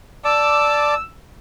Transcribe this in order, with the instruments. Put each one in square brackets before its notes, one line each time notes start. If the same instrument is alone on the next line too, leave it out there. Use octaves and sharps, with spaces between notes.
[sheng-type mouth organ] D5 A5 D6 [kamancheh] E6